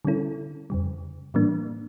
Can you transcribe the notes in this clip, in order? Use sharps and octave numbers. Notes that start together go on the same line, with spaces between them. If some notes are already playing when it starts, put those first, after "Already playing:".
D3 G3 C#4 E4 A4
F2 C#3 G3
A2 E3 G3 A#3 D4